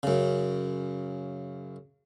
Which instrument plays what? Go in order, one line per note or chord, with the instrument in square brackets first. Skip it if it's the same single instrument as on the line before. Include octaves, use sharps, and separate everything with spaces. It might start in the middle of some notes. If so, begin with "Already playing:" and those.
[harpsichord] F#2 C#3